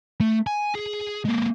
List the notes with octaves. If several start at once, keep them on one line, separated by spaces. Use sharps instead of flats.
A3
G#5
G#4
G#3 A#3